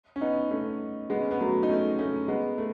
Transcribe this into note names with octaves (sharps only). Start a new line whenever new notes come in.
C#4
B3 D#4
A3 C#4
G#3 B3
C#4
B3
F#3 A3
D#4
A3 C#4
A3 C#4
G#3 B3
A3